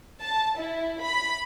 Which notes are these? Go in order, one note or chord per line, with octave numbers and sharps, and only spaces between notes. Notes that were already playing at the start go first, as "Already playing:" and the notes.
A5
E4
B5